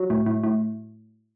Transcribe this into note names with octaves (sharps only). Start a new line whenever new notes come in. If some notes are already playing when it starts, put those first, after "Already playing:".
Already playing: F#3
A2
A2
A2